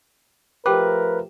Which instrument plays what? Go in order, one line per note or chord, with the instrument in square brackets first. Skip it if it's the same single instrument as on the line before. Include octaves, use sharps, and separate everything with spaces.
[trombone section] F3 A3 A#4 [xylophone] G4 G5 D6 [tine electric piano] B4